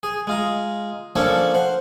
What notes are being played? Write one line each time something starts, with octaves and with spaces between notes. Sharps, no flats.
G#4
G#3 F4 A#5
F3 A#3 C#4 D4 A4 C#5
C5 F#5